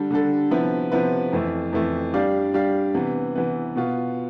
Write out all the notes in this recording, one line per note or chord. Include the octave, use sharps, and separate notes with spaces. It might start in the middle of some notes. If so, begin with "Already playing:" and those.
Already playing: D3 G3 D4 A4
D3 G3 D4 A4
C3 F3 B3 E4 B4
C3 F3 B3 E4 B4
F2 E3 A3 E4
F2 E3 A3 E4
G3 D4 G4 D5 F5
G3 D4 G4 D5 F5
C3 E3 B3
C3 E3 B3
B2 B3 F4